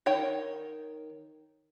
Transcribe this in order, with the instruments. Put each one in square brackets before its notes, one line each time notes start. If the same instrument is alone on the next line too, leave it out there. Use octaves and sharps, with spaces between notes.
[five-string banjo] D#3 C#5 G5